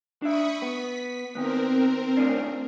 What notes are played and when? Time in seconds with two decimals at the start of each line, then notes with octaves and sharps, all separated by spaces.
0.22 D4 E5 B5 C#6 D#6
0.62 B3 B6
1.35 D#3 B3 C4 A#4
2.17 A2 C#4 D4